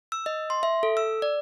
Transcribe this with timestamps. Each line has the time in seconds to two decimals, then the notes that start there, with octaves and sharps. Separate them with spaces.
0.12 E6
0.26 D#5
0.50 C6
0.63 E5
0.83 A4
0.97 E6
1.22 D5